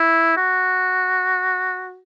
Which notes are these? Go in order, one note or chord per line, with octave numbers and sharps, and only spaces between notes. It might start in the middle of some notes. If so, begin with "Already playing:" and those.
Already playing: E4
F#4